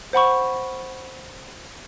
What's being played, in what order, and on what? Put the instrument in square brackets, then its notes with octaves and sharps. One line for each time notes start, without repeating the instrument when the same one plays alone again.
[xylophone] C5 F#5 B5 C#6